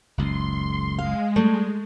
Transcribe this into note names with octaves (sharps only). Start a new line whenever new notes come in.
F#1 C#2 C6
G#3 F5
G3 A3